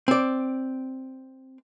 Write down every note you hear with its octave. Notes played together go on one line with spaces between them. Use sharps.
C4 D5